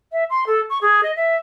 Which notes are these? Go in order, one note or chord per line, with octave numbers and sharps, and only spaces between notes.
E5
C6
A4
C#6
G#4
D#5
E5